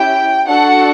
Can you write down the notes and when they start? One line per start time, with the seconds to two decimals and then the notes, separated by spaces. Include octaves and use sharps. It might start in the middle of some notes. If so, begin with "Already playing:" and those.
Already playing: C#4 E4 G4 G5
0.48 D4 F#4 A4 F#5